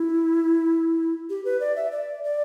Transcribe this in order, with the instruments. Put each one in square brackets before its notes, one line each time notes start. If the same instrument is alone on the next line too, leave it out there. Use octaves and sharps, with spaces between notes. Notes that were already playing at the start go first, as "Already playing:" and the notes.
Already playing: [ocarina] E4
G4
B4
D5
E5
D5
D5